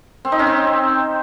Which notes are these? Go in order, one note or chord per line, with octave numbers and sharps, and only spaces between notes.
C4
D#4
C#4
C4